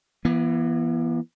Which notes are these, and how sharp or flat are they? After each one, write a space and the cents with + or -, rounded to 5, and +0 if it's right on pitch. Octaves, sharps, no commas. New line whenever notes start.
E3 +25 B3 -35